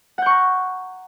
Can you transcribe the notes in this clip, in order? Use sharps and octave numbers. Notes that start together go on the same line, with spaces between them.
F#5 A#5 C#6 G6